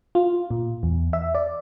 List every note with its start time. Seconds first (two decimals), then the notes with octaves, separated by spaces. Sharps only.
0.15 F4
0.51 A#2
0.83 E2
1.13 E5
1.35 D5